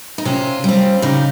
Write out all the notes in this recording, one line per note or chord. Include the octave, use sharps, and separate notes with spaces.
D#4
C3 C#4 F4
G3 C4
C#3 D#4 G4